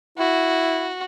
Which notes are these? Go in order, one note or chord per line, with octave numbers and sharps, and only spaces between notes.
E4 F#4